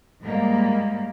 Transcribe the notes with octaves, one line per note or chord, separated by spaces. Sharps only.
G#2 G3 A#3